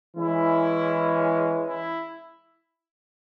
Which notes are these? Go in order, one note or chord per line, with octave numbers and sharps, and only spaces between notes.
E3 G#3 C#4 E4
E4